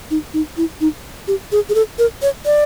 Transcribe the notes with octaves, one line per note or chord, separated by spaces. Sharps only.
D#4
D#4
E4
D#4
G4
G#4
G#4
A4
A#4
C#5
D5